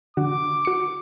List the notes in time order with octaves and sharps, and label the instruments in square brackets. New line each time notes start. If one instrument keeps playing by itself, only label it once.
[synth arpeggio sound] D3 F#4 [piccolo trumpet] D6
[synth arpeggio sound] F#4 C#7